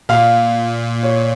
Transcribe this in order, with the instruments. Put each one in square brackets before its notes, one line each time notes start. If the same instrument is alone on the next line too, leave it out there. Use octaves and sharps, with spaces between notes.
[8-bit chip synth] A#2 [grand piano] F5
[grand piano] C#5